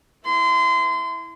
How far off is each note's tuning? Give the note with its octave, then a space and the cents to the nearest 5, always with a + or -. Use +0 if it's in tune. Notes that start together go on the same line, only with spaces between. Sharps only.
E4 +0 C6 -30